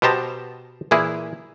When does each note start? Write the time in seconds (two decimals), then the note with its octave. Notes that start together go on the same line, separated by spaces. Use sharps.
0.02 B2 B3 G4 C5 A5 A#5
0.91 A#2 E3 A#3 E4 G#4